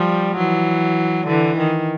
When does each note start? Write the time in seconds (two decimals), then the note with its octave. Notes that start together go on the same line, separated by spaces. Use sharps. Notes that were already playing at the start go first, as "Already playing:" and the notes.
Already playing: F3 G3
0.37 E3 F#3
1.28 D3 E3
1.58 D#3